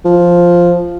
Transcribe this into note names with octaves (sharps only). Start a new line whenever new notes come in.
F3